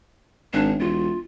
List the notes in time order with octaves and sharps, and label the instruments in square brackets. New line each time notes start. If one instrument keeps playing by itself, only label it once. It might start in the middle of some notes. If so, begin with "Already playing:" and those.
[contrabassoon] G#1 [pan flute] D4
[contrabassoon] E1 [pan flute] F4